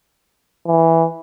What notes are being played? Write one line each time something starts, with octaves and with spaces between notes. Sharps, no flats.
E3